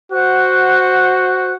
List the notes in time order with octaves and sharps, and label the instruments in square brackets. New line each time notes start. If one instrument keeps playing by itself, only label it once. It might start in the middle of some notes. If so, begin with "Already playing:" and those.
[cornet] F#4 [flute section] C5 F#5 F#6